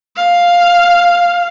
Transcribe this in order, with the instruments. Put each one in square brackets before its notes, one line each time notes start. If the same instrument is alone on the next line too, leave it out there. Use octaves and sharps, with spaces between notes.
[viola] F5